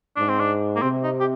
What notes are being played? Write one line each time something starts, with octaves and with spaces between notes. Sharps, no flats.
G#2 D4
C4
D4
A#3
C3 C4
D#4
G4